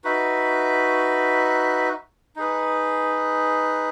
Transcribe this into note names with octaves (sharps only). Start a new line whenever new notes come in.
D#4 F#4 B4 E5
D#4 G#4 B4